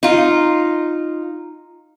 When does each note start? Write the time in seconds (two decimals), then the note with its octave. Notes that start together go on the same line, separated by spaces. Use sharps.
0.03 D#4 F4